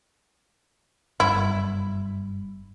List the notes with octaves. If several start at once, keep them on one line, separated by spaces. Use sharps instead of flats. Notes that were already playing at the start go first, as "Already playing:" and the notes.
F#1 G2 E4